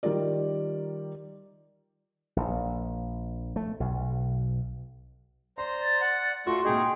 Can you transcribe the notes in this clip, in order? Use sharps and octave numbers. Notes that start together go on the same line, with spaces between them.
D#3 G3 F4 A#4 D5
A#1
A3
B1
C5 D5 A#5 C6
A6
F#5
A3 F4 F#4 C6 C#6
A#2 G#3 D#4 G#4 G5